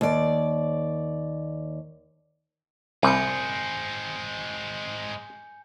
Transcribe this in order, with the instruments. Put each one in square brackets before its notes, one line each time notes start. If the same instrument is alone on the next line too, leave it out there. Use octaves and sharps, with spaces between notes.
[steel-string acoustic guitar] D#2 D5
[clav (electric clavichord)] C2 [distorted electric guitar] G#3 C4 [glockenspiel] G#5 G6 C#7